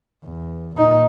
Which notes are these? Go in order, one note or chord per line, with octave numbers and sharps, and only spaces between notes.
E2
A#2 D#4